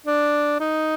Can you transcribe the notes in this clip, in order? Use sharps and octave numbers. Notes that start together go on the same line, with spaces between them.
D4
D#4